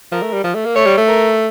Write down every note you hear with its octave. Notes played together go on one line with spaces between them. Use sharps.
F3 A#4
A3
G3
F3
A3
A#3
A3 C#5
G3
A3
A#4